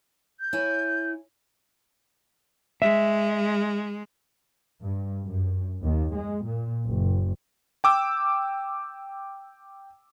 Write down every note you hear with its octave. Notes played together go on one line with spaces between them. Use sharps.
G6
E4 C#5 G#5
G#3 E5
G2
F#2
D#2
G#3
A#2
F#1
G5 D6 E6